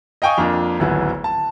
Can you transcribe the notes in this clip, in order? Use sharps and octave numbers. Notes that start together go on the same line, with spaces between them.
D#5 F5 G5 G#5 C#6 D#6
F2 A#3 D4 F4
D1 G#1 F#3 B3 E4 G#5
A5